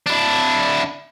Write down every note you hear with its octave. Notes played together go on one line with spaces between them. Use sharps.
D4 E4